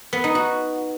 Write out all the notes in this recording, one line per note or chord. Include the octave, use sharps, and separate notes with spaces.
B3
D#4
F#4